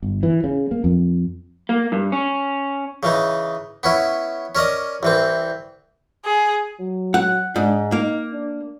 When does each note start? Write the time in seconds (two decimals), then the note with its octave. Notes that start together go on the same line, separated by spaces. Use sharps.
0.03 G1
0.23 E3
0.44 C#3
0.71 A#3
0.84 F2
1.69 A#3
1.92 G2
2.12 C#4
3.03 C#3 E3 D#4
3.83 B3 C#4 E4
4.55 C#4 A#4 D5 D#5
5.03 C2 E3 C4
6.25 G#4
6.79 F#3
7.14 F#5
7.56 G#2 D4
7.92 A#3 D#4
8.33 D4